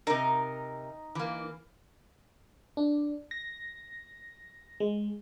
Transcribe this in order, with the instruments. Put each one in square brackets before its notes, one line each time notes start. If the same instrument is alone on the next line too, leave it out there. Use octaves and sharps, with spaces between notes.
[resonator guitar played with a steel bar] C3 A#4 [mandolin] D#4
[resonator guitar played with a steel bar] E3 A#3
[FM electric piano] D4
A#6
G#3